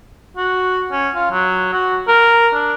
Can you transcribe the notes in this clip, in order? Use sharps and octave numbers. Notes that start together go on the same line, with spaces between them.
F#4
C#4
F4
F#3
F#4
A#4
D4